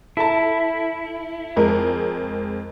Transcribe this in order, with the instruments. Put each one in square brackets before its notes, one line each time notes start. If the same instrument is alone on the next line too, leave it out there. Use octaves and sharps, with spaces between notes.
[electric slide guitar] E4 [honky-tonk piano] A4 A5
[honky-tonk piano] F2 G#3 A#4